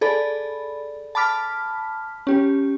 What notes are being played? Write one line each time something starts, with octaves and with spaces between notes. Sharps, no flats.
G#4 A4 D5 B5
A5 B5 D6 F6 B6
C#4 G4